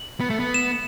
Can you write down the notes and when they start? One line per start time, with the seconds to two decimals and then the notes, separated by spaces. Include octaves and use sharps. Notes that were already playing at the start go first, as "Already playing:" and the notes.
Already playing: F#7
0.20 B3
0.30 A3
0.40 B3
0.54 E7